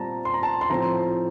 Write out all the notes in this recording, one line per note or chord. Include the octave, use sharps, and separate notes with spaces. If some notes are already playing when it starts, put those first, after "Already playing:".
Already playing: A#2 G3 C4 A5 A#5
C6
A#5
A5
C6
A2 F3 C4 A#5